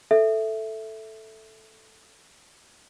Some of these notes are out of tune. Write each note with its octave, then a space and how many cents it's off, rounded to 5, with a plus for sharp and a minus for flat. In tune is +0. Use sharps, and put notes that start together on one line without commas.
A4 +0 E5 +0